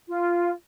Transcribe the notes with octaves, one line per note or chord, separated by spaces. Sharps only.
F4